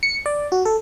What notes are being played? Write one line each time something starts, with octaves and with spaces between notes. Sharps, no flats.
C#7
D5
F#4
A4